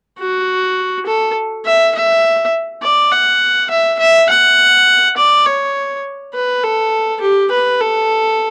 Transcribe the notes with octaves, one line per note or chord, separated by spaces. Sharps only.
F#4
A4
E5
E5
D5
F#5
E5
E5
F#5
D5
C#5
B4
A4
G4
B4
A4